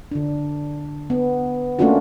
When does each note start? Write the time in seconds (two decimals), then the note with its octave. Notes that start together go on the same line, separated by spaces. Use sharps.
0.11 D3 D4
1.10 B3
1.79 A3 A#3 C#4 D4 F4 F#4